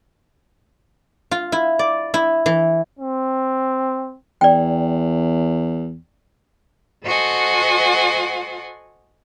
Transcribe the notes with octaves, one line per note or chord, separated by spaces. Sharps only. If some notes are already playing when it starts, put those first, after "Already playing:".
F4
E4
D5
E4
E3
C4
E2 D5 G5
F#4 A4 C5 D#5 F#5 G#5